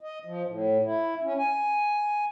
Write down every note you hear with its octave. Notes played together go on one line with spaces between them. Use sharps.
D#5
F3
A2
E4
C#4
G#5